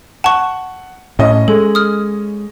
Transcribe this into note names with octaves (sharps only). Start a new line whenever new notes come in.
F#5 A5 C#6
A2 C#4 D#5
G#3 A4
D#6 F6